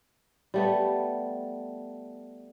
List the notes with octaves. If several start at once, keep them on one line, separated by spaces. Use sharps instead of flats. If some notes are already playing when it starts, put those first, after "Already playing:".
G3 A3 B3